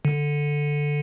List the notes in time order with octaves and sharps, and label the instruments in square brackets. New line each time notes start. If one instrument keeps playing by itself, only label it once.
[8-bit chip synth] D3